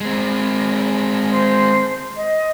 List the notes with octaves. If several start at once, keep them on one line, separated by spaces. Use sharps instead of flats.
G#3 C4
C5
D#5